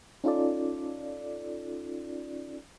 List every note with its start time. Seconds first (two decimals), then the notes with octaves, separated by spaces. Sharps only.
0.24 C#4 D#4 F4 A4 D5